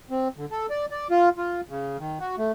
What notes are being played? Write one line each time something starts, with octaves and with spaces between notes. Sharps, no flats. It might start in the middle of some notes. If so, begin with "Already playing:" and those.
C4
D3
A4
D5
D5
F4
F4
C#3
D#3
F#4
A3